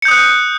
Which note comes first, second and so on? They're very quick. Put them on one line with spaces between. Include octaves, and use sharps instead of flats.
C#7 G6 D#6 F#6